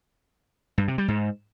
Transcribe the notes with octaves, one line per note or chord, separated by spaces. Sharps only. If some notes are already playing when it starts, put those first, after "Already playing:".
G2
C3
G3
G#2